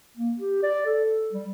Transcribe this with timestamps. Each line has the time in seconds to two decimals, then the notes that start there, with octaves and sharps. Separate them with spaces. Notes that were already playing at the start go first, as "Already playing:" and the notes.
0.17 A#3
0.39 G4
0.63 D5
0.86 A4
1.33 G3